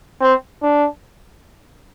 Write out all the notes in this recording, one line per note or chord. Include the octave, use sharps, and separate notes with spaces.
C4
D4